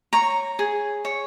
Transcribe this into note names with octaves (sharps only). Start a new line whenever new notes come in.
C#5 A#5
G#4
C#5